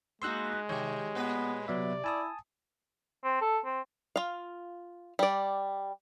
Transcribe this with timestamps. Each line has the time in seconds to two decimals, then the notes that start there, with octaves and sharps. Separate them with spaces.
0.22 G#3 A#3 B3 D#4 F#4 C6 E6 F#6
0.69 C3 D#3 G4 C#5
1.15 A#2 B3 B4
1.68 C3 F#3 B3 D5 E5
2.04 E4 G#5 A5 D#6
3.24 C4
3.41 A4
3.65 C4
4.16 F4 F5
5.19 G3 D5